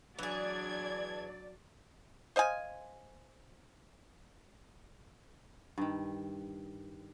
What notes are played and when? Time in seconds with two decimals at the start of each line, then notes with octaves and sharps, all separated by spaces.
0.19 E3 F#3 D4 G#4 D5 G#6
2.36 C5 D#5 F5 G#5
5.78 G2 D#3